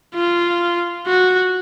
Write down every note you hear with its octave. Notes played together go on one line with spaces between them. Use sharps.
F4
F#4